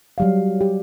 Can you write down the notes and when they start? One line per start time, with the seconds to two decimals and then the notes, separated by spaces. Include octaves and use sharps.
0.18 F#3 G3 F5
0.61 G4